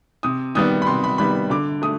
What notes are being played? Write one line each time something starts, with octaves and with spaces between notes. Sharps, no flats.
C3 D#6
D#3 G3 B3 D#6
B5
C3 C6
B5
D#3 G3 B3 B5
D3 D6
A3 D#6